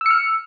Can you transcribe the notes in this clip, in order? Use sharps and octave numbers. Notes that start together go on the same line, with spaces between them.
E6 F6 C#7